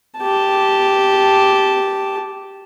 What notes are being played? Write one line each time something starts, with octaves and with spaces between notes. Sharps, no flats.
G4 A5